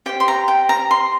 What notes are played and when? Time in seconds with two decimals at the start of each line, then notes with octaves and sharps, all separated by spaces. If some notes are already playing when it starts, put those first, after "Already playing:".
0.06 G4 C5 G5
0.20 C6
0.28 A#5
0.48 G5
0.69 A#5
0.91 C6